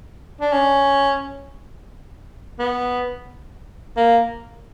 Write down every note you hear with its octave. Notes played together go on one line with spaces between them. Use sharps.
D4
C#4
B3
A#3